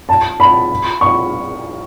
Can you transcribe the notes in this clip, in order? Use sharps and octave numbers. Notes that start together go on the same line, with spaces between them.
A5
B5
C#6